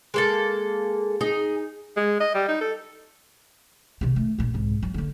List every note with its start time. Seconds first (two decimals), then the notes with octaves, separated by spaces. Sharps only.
0.14 G#3 A#3 A4
1.21 D#4 G#4
1.97 G#3
2.20 D#5
2.35 G3
2.48 D#4
2.61 A4
4.01 C3 D#3
4.16 A3
4.38 A#1 A#2
4.54 C2 G#2
4.83 F#3
4.94 D3 A#3